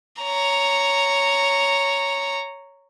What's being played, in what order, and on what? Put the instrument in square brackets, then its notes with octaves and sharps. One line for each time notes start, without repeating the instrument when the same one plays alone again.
[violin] C#5 A#5